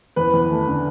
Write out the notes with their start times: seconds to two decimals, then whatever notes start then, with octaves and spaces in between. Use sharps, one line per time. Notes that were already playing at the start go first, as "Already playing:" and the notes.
0.16 E2 B4
0.34 E2
0.50 A3
0.67 D3